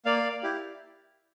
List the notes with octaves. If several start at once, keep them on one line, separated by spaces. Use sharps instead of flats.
A#3 D5 F5
E4 G4